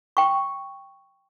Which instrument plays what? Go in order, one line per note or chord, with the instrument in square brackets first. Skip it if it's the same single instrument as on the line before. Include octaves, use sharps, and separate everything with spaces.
[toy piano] G5 C#6